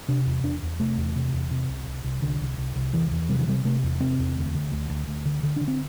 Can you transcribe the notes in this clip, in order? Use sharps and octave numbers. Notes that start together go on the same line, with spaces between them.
C3 D4
E2
E2 D4
E2
C3 A3
E2
C3
E2
C3
C2
C2
C2
C2 D3
C2
C2
C2
E2 E3
E2
C3 G3
E3
C3 G3
C3 A3
E2
C3 C4
E2
D2
D3
D2
D2
D2
D3
D3
D3 D4
C4